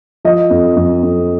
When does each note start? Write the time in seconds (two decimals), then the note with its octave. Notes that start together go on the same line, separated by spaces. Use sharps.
0.25 F3 D#5
0.50 F2
0.76 F2
1.03 F2